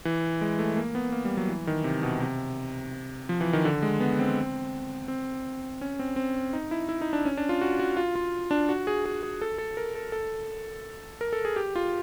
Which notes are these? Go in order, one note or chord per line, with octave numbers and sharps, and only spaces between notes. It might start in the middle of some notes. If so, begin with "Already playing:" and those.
E3
G#3
A3
A#3
B3
A#3
G3
F#3
E3
D#3
C3
B2
C3
F3
E3
D#3
D3
G#3
B3
C4
C4
C#4
C4
C4
D#4
E4
E4
D#4
D4
C#4
D4
F4
F#4
F#4
F4
F4
D4
F#4
G#4
G#4
G#4
A4
A4
A#4
A4
A4
A#4
A4
G#4
G4
F4